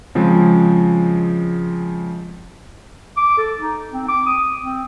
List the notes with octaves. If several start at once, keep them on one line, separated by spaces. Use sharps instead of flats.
C#3 F3 G#3 C4
D6
A4
D#4
C4
D6
D#6
C4